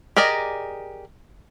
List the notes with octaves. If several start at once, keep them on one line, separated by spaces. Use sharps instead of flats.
G4 G#4 A#4 D5 D#5